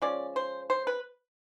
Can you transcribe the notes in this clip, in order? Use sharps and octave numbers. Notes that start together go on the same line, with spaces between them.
F3 G#3 C#4 D5
C5
C5
B4